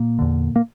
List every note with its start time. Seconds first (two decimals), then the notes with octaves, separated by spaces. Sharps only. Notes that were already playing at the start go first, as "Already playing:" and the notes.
Already playing: A#2 A#3
0.19 E2 D3
0.56 A#3